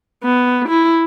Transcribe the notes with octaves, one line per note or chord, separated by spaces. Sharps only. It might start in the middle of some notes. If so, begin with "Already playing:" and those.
B3
E4